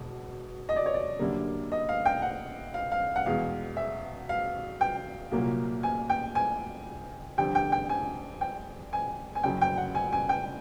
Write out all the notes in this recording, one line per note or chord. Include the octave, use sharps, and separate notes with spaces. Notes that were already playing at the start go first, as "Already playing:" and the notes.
Already playing: E1 B2
D#5
D5
C#5
D5
G1 F#2 D3 G3 A#3
D#5
F5
G5
F#5
F5
F5
F#5
E2 B2 G#3 F5
E5
F5
G5
C2 A#2 F#3 A#3
G#5
G5
G#5
F2 D3 G3 G5
G5
G5
G#5
G5
G#5
G#5
F#1 F#2 C#3 F#3 G5
G5
F#5
G#5
G#5
G5